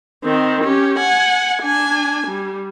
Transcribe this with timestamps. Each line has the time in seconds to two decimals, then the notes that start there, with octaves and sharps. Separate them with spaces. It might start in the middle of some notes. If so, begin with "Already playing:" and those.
0.24 D#3 C4
0.64 C#4 G4
0.99 F#5 G#5
1.63 D4 G#5
2.28 G3